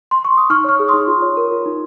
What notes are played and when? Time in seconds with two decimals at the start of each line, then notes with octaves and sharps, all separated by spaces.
0.11 C6
0.25 C#6
0.38 D#6
0.50 D#4 C#6 F6
0.64 C#5 C#6 F6
0.80 G#4
0.88 D#4 C6 D#6
1.07 F4
1.22 C#5
1.37 A#4
1.52 F4
1.66 D#4